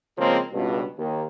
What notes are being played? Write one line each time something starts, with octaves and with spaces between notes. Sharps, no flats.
C#3 F3 G#3 A#3 C4 C#4
C#2 G2 B2
D#2 D#3